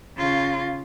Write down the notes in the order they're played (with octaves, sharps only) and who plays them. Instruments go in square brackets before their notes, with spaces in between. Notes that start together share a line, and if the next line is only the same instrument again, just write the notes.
[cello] C#3 F4